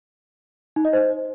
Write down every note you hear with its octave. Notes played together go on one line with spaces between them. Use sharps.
D#4
D#5
C5